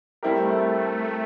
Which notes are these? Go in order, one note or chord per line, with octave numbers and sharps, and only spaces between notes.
G3 A3 C4 E4 G4 A#4